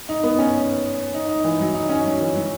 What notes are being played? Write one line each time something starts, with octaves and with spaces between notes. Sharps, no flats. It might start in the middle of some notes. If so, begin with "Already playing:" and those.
D#4
B3
C#4
D#4
D#4
E3
F#3
D#4
C#4
F#3
E3
F#3